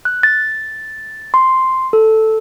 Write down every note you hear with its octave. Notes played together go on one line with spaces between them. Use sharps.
F#6
A6
C6
A4